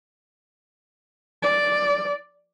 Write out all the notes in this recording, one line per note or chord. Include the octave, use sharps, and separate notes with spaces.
D5